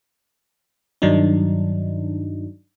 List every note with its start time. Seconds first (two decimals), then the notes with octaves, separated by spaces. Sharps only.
1.02 G2 D#3 F#3 D4 D#4